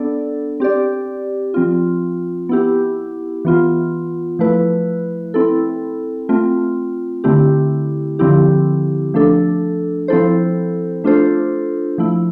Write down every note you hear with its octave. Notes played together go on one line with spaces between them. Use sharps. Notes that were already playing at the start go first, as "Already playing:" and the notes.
Already playing: B3 D4 A4 D5
C4 G4 D5
F3 C4 F4
B3 E4 G4
E3 B3 F4
F3 A3 E4 B4
C4 E4 A4
A3 C4 F4
D3 A3 C4 E4 G4
D3 F3 C4 E4 G4
F3 A3 D4 A4
F3 C4 E4 A4 C5
A3 D4 F4 A4 C5
F3 A3 E4